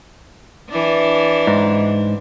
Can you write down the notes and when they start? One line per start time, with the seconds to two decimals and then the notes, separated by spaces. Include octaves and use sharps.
0.70 E3 D4
1.47 G#2